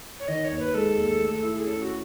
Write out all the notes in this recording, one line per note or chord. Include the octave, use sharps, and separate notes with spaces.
C#5
D#3 D#5
C#5
D#2
B4
G#3 A4
D#2
A3
E4
G#4
C#4 A4
F#4